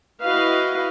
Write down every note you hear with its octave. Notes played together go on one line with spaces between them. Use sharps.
E4 F#4 B4 D#5 F5